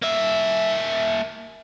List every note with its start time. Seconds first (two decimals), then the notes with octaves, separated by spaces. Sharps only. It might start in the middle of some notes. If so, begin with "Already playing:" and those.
0.02 A#3 E5